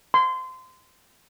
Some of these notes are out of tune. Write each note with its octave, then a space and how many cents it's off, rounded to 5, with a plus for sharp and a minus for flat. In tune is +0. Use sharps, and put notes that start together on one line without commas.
C6 -25